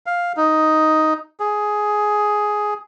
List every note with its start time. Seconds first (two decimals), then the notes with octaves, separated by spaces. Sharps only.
0.06 F5
0.37 D#4
1.40 G#4